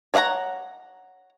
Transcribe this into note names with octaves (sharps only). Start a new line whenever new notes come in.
C#5 D5 F5 F#5 A#5